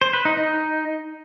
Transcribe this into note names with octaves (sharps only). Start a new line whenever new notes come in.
C5
B4
D#4
D#4